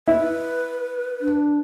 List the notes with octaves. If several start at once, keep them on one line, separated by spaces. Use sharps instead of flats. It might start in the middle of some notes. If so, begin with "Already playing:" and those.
E4 B4
D4